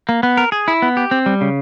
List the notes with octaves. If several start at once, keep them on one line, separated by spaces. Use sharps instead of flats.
A#3
B3
A#4
G#4
E4
B3
G4
C4
G3
C#3